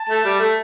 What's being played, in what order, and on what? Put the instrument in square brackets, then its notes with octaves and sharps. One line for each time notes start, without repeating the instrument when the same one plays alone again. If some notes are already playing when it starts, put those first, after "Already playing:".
Already playing: [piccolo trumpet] A5
[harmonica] A3
G3
A3